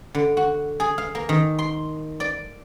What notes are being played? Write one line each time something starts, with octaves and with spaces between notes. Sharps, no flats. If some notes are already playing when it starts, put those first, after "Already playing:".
D3
F#4
G#4
F5
A#3
D#3
C6
D5